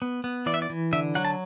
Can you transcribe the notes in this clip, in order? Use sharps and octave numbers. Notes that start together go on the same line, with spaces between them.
B3
B3
E3 D5
E5
D5
E3
D3 E5
F#3 F#5
A5